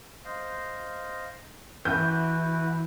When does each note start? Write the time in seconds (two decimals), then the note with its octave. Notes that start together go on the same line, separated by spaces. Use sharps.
0.25 C5 D#5 F5
1.85 E3 E4 F#4 B4 G6